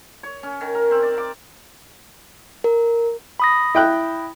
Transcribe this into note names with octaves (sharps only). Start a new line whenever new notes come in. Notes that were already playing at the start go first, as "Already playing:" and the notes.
C#5
C#4
D#3
A#4
C4
D5
D6
A#4
B5 D#6 A#6
E4 G5 F#6